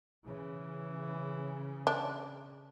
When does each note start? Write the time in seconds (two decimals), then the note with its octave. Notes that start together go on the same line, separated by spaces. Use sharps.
0.25 C#3 E3
1.87 D4